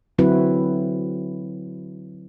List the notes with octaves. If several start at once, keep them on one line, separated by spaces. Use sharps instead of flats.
D3 F#3 C4 E4 F#4 B4